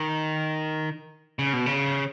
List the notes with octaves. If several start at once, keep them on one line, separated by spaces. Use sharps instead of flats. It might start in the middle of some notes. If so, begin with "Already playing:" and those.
Already playing: D#3
C#3
B2
C#3